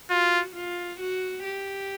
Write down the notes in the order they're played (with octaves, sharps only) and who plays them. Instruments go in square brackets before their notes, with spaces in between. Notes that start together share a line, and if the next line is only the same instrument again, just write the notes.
[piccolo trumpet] F4 [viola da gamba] F#4
[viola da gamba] F4
F#4
G4